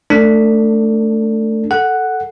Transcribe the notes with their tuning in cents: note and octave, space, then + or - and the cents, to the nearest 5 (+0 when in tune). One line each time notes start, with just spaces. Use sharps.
A3 +0 D4 +0 A4 +35
A4 +0 F#5 +0